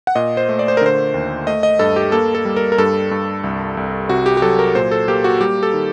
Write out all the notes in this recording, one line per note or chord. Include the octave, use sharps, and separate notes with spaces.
F#5
A#2 D#5
C5
A3
D5
C5
A#4
D3 C5
D#2
A3 D#5
D#5
G2 A4
G4
A#3 A4
A4
G3
A#4
A#4
G2 A4
G2
C2
C2
C3 F#4
G4
G4
F#3 A4
A#4
A#2 C5
A4
A#3 G4
F#4
G3 G4
A4
D#3